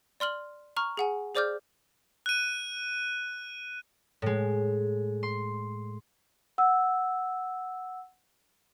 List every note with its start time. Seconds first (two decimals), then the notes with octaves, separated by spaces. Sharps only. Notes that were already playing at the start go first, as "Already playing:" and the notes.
0.20 D5 C6 F6 F#7
0.77 A#5 C#6 F6
0.97 G#4 F#5 G#5
1.35 G#4 C5 D5 D6 F6 G6
2.26 F#6 D#7
4.22 A2 G#3
5.23 C6
6.58 F#5 E6